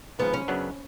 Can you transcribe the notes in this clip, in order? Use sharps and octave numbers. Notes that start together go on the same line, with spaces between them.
G#1 G#2 F3 B3
C#4
F#2 C#3 F#3 B3 D4